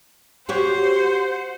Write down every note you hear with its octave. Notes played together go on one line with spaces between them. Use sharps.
F#4 G4 C5 C#5 F#5